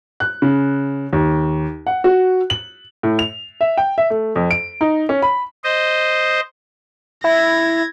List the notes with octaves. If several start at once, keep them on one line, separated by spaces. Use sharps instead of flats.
F#6
C#3
D#2
F#5
F#4
F#7
A2
F7
E5
G5
E5
A3
F2
D7
D#4
C#4
B5
C5 D#5
E4 G#6 A#6